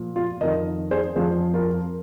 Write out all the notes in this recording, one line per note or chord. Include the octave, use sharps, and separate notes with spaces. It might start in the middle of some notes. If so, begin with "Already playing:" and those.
Already playing: A#2 F3
F4
F2 D#3 A#4 D#5
G#4 C5
F2 F3 G#4 C5
F4 A#4